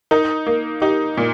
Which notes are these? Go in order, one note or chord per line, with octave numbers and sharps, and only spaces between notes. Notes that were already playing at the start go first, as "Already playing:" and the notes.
D#4 A#4
A#3
D#4 G4
A#2